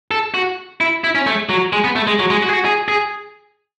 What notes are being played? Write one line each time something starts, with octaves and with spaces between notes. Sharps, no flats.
A4
F#4
E4
E4
C#4
A3
F#3
G#3
B3
A3
G#3
F#3
G#3
F#4
G#4
F#4
G#4
G#4